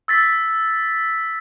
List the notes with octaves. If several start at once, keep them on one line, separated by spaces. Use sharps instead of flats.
E6 A6 B6